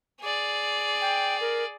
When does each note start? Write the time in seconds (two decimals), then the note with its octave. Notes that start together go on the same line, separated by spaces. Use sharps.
0.21 G#4 D5
1.01 G5
1.41 A#4